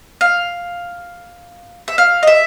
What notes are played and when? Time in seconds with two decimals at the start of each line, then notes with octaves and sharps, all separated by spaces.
0.21 F5
1.88 E5
1.98 F5
2.23 D#5
2.27 E5